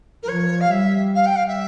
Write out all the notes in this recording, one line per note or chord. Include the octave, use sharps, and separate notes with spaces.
A#4
F3 C#5
F5
G3 E5
F5
G5
F5
E5